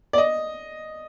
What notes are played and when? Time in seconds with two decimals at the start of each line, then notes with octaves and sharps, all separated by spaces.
0.13 D5
0.18 D#5